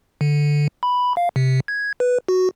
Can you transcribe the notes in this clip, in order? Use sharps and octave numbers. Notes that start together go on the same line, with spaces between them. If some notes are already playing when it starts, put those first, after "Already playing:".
D3
B5
F5
C3
G#6
B4
F#4